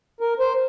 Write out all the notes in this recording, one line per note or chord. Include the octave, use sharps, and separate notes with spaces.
A#4
C5